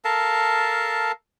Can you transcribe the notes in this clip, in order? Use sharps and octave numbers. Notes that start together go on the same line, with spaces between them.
A4 A#4 F5 A5